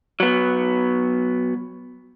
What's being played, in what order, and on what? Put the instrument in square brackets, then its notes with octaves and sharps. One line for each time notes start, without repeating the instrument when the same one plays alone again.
[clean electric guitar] F#3 B3